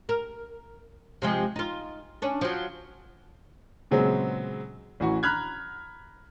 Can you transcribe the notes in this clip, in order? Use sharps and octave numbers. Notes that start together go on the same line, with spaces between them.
A#4
C3 F3 G#3
D#4 F4
C#4 D4
F3 F#3
A#2 C#3 F#3 G#3 B3 C4
A1 E3 F#4 C#6
A#5 B5 F6 F#6 G#6